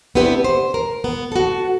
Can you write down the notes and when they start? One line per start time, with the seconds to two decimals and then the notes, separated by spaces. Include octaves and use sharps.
0.15 B3 C4 D4 E4 G4 B4
0.44 C5
0.74 A#4
1.04 B3
1.32 F#4 A4